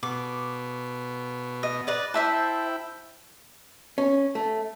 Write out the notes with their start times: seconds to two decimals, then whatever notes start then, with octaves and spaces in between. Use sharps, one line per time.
0.03 B2 D6
1.63 D#5
1.87 B4 D5 D#5
2.14 E4 C5 E5 G5 A5
3.98 C#4
4.35 A3